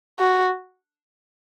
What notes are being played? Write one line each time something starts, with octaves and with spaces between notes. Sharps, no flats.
F#4